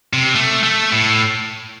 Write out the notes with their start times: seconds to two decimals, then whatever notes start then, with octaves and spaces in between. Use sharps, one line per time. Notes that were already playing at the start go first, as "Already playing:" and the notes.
0.13 C3
0.35 A3
0.63 A3
0.92 A2